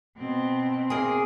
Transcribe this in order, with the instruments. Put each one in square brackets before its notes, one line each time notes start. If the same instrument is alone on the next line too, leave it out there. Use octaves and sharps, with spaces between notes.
[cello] B2 C4
[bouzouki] A#3 G#4